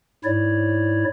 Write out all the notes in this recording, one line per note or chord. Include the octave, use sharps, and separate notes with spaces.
G#2 E4 C#5 D5